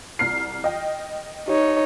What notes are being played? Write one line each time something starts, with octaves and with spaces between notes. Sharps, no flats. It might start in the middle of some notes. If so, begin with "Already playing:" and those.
C2 F6 C7
D#5 G5
D#4 G4 C#5